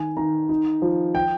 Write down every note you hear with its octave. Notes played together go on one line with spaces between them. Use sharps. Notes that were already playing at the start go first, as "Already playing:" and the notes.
Already playing: D#3 G#5
D#3 A#5
D#4
F3
G5